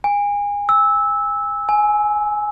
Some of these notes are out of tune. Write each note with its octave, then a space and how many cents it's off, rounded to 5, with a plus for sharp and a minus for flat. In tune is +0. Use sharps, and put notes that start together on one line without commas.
G#5 -30
E6 -15
G#5 +10